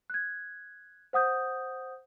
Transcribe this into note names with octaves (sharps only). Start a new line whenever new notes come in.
F#6 G#6
C5 F#5 D#6 G6